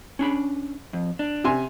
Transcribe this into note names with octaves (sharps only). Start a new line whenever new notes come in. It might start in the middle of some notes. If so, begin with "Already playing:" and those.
C#4 D4 B5
F2
D4
C3 G#5 C6